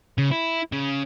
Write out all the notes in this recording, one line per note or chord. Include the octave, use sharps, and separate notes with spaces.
C#3
E4
C#3